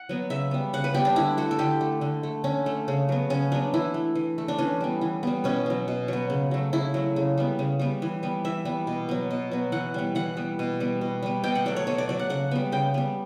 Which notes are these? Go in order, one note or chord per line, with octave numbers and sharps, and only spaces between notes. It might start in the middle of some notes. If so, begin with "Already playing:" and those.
Already playing: F#5
F#3 B3
C#3 E5
G3 B3
C#3 F#5
B4
G3 B3 G4
D4
D3 E4
A3 F#4
A4
D3 G4
A3
D3
A3
D3 C#4
A3
C#3
F#3 B3
C#3 C#4
F#3 B3 D4
E3 E4
A3
E3
A3
D4
E3 C#4
G3 B3
E3
G3 B3
B2 C#4
F#3 B3
B2
F#3 B3
C#3
F#3 A3
C#3 E4
F#3 A3
C#3
G3 B3
C#3
G3 B3
E3
G3 B3
E3 E5
G3 B3
B2
F#3 B3
B2
F#3 B3
E3 F#5
G3 B3
E3 F#5
G3 B3
B2
G3 B3
B2
G3 B3
B2 G5
F#5
F#3 A3 D5
C#5
B2 C#5
D5
F#3 A3 D5
F#5
C#3 F#5
G3 B3
C#3 G5
G3 B3